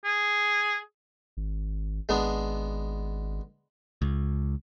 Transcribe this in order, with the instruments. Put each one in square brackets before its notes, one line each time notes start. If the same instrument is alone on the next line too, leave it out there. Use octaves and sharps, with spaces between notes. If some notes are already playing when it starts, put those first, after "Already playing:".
[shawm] G#4
[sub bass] G#1
[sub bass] G#1 [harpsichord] G#3 B3 D4
[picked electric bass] C#2